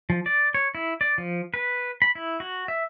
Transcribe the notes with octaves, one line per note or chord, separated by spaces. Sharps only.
F3
D5
C#5
E4
D5
F3
B4
B5
E4
F#4
E5